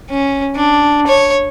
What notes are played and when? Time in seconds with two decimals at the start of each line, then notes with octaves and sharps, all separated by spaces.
0.10 C#4
0.55 D4
1.07 C#5